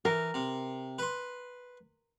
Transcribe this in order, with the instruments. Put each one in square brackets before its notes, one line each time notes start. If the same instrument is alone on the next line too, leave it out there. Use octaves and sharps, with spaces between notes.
[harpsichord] E3 [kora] A#4
[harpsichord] C3
B4 C6